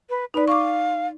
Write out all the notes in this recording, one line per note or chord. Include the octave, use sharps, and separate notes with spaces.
B4
D#4 B4 D5
F5 C#6 D6